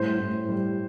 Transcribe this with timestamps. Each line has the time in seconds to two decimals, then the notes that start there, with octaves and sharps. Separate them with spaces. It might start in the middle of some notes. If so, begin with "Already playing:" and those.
Already playing: A2 G3 C5
0.19 A2
0.49 G3